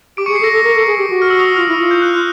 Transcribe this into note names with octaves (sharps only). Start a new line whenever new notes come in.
G4 D6 D7
C#6 C#7
G#4
C7
A4
A#6
A4
A#4
A4
G#4
G4
F#4
F6
E6
D#6
E6
F4 F6
E4
F4
G6
F#6
F6